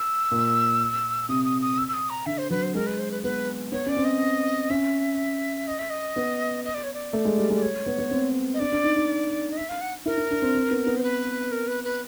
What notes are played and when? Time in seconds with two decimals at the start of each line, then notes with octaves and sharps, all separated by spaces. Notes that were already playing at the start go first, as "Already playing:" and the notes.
Already playing: E6
0.31 A#2
1.29 C3 D#6
1.45 D#6
1.62 D#6
1.78 E6
1.88 E6
1.94 D#6
2.10 A#5
2.26 D3 E5
2.38 C5
2.50 F#3 B4
2.63 C5
2.75 G#3 A#4
2.87 B4
2.99 C5
3.11 B4
3.23 B3 B4
3.72 B3 C#5
3.86 C#4 D5
3.97 C4
4.05 D#5
4.70 C#4 E5
5.67 D#5
5.79 E5
5.90 D#5
6.16 B3
6.65 D#5
6.75 D5
6.84 C#5
6.94 D5
7.13 A3
7.25 G#3
7.38 G3
7.50 G#3
7.54 D5
7.62 C#5
7.86 B3
7.98 B3
8.11 C4
8.54 D#5
8.59 D4 D5
8.72 D4
8.84 D#4
8.96 D#4
9.52 D#5
9.57 E5
9.69 F5
9.81 F#5
10.06 E4 A#4
10.18 E4
10.31 D4
10.42 C4
10.55 C4
10.71 B3
10.87 B3
10.97 C5
11.03 B4
11.52 A#4
11.68 B4
11.84 B4